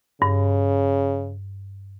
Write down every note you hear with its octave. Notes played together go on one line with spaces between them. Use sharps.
G2 C#3